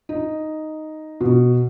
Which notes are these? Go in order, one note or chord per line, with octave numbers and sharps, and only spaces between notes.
D#4
B2